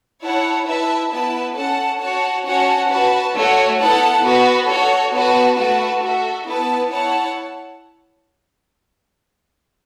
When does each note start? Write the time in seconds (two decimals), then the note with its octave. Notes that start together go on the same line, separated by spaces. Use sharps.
0.22 E4 C#5 F#5 A5
0.67 E4 B4 E5 A5
1.12 B3 E4 B4 A5
1.56 C#4 A4 F#5 A5
2.01 F#4 C#5 F#5 A5
2.45 C#4 F#4 C#5 F#5 A5
2.90 F#4 B4 A5
3.33 A3 F#4 C#5 F#5
3.78 B3 E4 A4 F#5 A5
4.23 B3 F#4 B4
4.67 F#4 A4 C#5
5.12 B3 F#4 B4 F#5 A5
5.56 A3 F#4 B4 A5
6.01 F#4 A4 E5
6.46 B3 E4 B4 A5
6.90 E4 C#5 F#5 A5